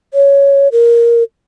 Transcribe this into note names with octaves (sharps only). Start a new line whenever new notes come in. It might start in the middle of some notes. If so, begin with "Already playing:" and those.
C#5
A#4